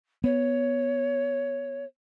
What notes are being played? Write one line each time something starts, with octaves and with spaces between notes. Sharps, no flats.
B3 C#5